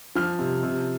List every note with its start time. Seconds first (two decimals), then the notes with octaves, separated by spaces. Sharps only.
0.15 F3 F6
0.39 C3
0.63 C3